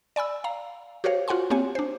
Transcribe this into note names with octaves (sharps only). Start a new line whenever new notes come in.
D5 G#5 B5 E6
F5 A#5
F#4 G4 A#4 C5 C#5 F5
F4 F#4 F#5 G#5 C6
A#3 C4 G4 C#5 G#5
D4 C5